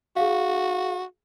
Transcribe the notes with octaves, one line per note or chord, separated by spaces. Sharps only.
F#4 G#4 F5